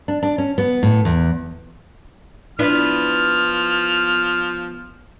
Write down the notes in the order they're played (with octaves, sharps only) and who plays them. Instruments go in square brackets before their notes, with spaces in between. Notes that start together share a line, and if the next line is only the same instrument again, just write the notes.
[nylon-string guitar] D4
D4
C#4
B3
A2
E2
[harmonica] F3 F6 [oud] B3 D4 E4